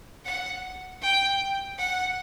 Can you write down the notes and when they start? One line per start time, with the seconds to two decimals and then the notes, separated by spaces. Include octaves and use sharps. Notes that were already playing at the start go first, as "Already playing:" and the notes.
0.25 F#5
1.01 G5
1.78 F#5